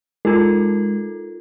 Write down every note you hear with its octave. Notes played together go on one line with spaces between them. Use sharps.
G#3 D#4 F4 A4 A#4 A5